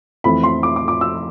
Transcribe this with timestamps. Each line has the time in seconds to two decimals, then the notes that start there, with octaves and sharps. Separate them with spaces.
0.24 F2 E3 A3 C4 B5
0.43 C6
0.63 D6
0.76 D6
0.88 D6
1.01 E6